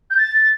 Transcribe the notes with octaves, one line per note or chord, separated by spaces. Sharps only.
G6
A6